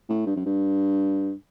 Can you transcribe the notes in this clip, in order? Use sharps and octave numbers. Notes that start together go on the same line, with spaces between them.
A2
G2
F#2
G2